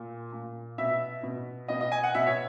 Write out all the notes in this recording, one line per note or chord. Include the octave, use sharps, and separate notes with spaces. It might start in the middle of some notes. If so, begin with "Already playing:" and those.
Already playing: A#2
A#2
B2 E5
B2
B2 D#5
D#5
G#5
F#5
B2 E5
C#5